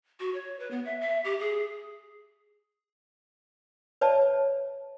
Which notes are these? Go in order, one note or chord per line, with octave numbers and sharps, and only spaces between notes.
F#4
C#5
B4
B3
E5
E5
G4
G#4
B4 C#5 D5 E5 A5